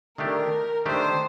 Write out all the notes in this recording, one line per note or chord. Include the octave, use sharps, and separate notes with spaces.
D#3 A3 D4 G4 A#4
D#3 A3 D4 G4 C5